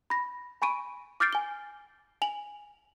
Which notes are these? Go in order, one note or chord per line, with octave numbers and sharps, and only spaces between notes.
B5 A#6
G#5 B5 C#6 D7 D#7
D6 F6 G6 A6 C7 D7
G#5 G7
G#5 F7 F#7